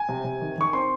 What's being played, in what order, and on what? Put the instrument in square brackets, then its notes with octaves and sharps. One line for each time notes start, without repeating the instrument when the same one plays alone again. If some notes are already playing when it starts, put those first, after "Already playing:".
Already playing: [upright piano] G#5
C3
C3
D#3
D#3 C#6
C4 C6